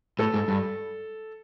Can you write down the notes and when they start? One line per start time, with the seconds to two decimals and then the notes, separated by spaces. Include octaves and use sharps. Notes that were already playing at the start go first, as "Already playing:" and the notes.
0.19 A2 A4
0.34 G#2
0.48 G2